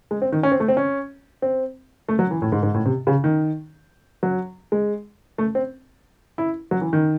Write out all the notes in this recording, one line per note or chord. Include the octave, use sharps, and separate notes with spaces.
G#3
C4
D#3
C#4
C4
A3
C4
C#4
C4
A3
F#3
E3
A2
G#2
G#2
A2
C3
C#3
D#3
F#3
G#3
A3
C4
E4
F#3
E3
D#3